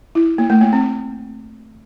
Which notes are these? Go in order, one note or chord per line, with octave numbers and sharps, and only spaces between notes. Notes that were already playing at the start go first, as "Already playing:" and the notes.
E4
A#3
A3
A#3
C4